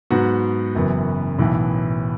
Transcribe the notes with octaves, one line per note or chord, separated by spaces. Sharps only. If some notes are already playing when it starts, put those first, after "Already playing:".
G#2 F#3 B3 F#4
F#1 F#2 E3 B3
B1 A2 E3 B3